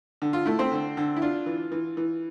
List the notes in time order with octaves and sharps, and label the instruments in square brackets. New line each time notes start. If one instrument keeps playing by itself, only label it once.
[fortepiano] D3
F4
A3 E4
C4 C5
D3
D3
E4
D4 F4
E3
E3
E3